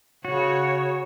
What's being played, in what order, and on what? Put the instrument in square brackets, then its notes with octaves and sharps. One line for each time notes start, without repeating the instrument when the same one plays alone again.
[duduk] C#3 [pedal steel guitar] F#4 [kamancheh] C#5